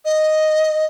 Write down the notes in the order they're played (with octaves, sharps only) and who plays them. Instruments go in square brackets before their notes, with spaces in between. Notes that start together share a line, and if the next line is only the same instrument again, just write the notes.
[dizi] D#5